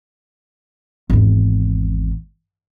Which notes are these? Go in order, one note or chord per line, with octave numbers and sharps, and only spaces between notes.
G#1 E2